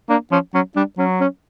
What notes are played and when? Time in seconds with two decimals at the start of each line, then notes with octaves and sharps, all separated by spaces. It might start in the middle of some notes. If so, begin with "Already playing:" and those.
0.09 A#3 D4
0.31 F3 C#4
0.54 F#3 C#4
0.76 G3 D4
0.98 F#3 C#4
1.20 C#4